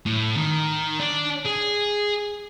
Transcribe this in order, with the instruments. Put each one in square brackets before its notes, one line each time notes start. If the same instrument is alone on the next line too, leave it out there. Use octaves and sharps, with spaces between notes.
[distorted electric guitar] A2
D#3
D4
G#4